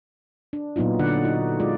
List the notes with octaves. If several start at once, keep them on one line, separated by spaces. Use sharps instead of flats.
D4
A#2 F#3 B3 D#4 F4
D3 D5 F#5
D#4 F#4
G#3 F4 D5